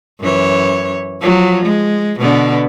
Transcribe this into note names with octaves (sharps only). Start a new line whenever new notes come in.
F#2 E3 C#5
F3 F#3
G#3
B2 D3 B3